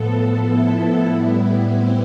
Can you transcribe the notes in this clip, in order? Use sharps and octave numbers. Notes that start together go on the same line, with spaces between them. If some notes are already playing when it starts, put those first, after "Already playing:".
Already playing: A2 F3 B3 A4
E4
A2 G3 B3
C4